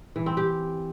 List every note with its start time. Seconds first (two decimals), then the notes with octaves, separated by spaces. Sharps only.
0.16 E3
0.26 C4
0.37 G4